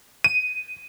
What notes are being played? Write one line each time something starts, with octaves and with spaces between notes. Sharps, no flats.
D#7